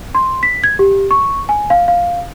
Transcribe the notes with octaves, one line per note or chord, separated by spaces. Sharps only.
C6
B6
G#6
G4
C#6
G#5
F5
F5